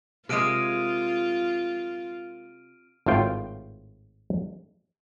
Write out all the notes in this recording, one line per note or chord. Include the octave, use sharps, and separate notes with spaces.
C3 G#3 A#3 F4 G#4 F6 D7 D#7
G#1 A2 F4 G5